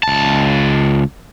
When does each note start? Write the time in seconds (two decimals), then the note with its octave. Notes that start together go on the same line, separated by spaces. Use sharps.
0.03 C#2 A5